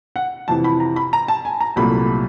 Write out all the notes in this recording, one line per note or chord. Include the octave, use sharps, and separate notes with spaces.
F#5
F2 C3 E3 A5
B5
A#5
B5
A#5
A5
G#5
A#5
C2 A#2 F#3 A3 B5